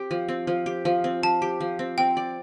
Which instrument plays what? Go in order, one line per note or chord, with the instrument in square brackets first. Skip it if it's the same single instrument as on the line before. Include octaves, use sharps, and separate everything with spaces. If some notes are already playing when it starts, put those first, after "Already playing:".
Already playing: [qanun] C4 G4
F3
C4
F3
G4
F3
C4
[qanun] F3 [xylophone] A5
[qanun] G4
F3
C4
[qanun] C4 [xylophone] G5
[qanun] D5